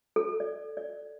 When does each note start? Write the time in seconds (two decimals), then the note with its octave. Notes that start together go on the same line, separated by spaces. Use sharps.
0.16 A4
0.40 D5
0.77 D5